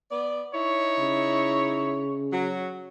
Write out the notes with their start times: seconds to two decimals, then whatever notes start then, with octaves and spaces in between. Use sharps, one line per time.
0.10 B3 D5
0.54 D#4 E4 C#5
0.99 C#3
2.32 F#3